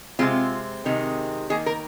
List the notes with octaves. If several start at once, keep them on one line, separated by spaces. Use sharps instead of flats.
C3 D#3 G#3 C4 F4
C3 D#3 G#3 C4
D#3 A#3 G#4
A#4